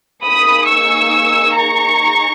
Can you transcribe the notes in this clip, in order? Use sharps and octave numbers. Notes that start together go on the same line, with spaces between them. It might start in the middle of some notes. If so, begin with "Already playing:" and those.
A#3 D#4 G#4 B5 D#6
C#6 E6
A#5 C#6
D#4 G#4